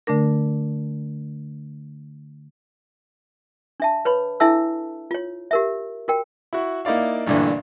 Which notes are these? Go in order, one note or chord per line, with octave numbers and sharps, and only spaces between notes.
D3 A3 D4 A#4
D4 E5 A5
B4 C#5 B5
D4 E4 A4 E5 A5 E6
F4 C#5
G4 A#4 E5
F#4 A#4 G5
E4 F#4
A#3 D#4 E4 D5 F5
A1 G2 A#2 D3 E3